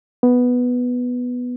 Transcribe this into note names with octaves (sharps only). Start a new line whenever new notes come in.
B3